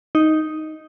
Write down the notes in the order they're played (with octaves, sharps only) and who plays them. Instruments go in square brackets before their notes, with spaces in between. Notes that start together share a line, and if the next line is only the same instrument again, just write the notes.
[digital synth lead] D#4